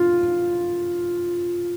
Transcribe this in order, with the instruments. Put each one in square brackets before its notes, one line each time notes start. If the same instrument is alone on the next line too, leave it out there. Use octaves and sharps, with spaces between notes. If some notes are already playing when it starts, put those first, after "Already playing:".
Already playing: [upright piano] F4